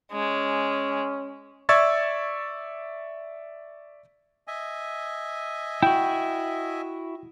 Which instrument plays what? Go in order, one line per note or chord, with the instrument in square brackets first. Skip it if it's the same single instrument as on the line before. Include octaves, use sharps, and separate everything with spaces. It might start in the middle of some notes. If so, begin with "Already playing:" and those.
[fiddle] G#3 [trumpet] C#4
[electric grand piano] D5 E5 C#6 E6 G#6 A6
[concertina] D#5 E5 G#5
[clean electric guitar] E4 F#4 [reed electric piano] G5